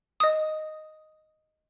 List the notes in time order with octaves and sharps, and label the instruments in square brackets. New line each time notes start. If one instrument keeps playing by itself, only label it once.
[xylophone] D#5 D#6